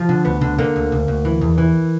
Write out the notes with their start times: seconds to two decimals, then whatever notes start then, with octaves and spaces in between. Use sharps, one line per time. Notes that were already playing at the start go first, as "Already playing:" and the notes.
Already playing: F3
0.09 D3
0.25 D2 B3
0.41 D3
0.58 D3 A#3
0.76 D2
0.92 D2
1.08 D2
1.25 E3
1.41 E2
1.58 E3